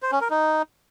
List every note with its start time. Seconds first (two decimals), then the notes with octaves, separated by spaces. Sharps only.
0.02 C5
0.12 C#4
0.21 A#4
0.30 D#4